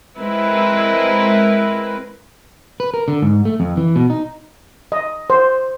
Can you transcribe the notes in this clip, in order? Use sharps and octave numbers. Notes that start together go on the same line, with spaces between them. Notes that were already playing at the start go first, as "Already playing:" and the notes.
G#3 C4 E4 A#4 B4
B4
A#4
D3
G#2
A3
F2
E3
B2
D#4
D#5
C5